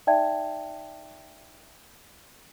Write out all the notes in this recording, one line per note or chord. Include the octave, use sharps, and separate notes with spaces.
D#4 D5 E5 G5 A5 G#6